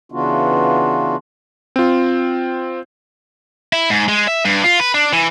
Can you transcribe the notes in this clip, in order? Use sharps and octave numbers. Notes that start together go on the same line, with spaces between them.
C#3 E3 B3 D4 F4 F#4
C4 F4
E4
G#2
G#3
E5
G2
F4
B4
D4
E3